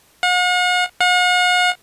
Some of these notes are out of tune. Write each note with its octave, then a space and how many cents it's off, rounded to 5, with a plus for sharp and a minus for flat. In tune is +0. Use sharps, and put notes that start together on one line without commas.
F#5 -45
F#5 -45